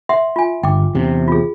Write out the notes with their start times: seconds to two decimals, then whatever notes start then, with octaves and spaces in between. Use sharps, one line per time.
0.09 E5 F#5 C6
0.36 F4 G#5
0.63 G1 G5 D6
0.95 E2 C3
1.28 F4 G#4